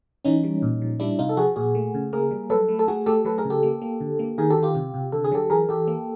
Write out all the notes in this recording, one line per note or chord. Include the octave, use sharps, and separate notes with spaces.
E3 C#4 D#4
G3
A#2
F3
G3 D4 E4
C3 D#4 F4
A4
F3 F#4 G#4
A#2 F#4 G#4
A3
C#3
A#3 G#4 A#4
G3
F#3 A4 B4
A3
A4
A3 F#4 G#4
A3 G4 A4
F#3 A4 B4
G#4 A#4
C#3
G4 A4
A#3
A#3
D3
A#3
D#3 G#4 A#4
G4 A4
D#3
F4 G4
C3
C3
D3 A4
G#4
F#3 G4 A4
E3 G#4 A#4
E3 G4 A4
A#3